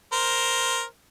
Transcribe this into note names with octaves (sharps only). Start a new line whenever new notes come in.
A#4 C5